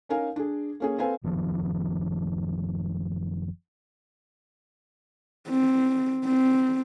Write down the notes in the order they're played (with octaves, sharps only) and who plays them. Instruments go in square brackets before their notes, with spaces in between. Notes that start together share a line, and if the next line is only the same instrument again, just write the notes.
[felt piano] C#4 D#4 A#4 F5 G#5
D4 G#4
A#3 C#4 G#4
C4 A4 B4 C5 F5 G#5
[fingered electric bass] F#1 D#3 F3 B3
[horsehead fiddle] C4
C4